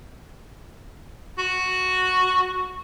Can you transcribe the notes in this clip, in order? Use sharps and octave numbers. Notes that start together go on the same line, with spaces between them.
F#4